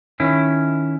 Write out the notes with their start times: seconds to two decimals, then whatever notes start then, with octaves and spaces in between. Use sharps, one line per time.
0.20 D#3 C#4 E4